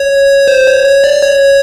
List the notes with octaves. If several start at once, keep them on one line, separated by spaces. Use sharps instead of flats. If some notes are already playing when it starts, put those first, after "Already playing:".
Already playing: C#5
C5
C#5
C#5
D5
C#5